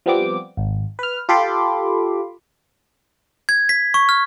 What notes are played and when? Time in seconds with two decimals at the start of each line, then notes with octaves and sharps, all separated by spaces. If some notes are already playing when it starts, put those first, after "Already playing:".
0.06 F3 G3 B3 C4 D6
0.57 G#1
0.99 B4 F6
1.29 F4 G4 A4 B5 C6 D6
3.49 G#6
3.69 B6
3.94 C#6
4.09 F6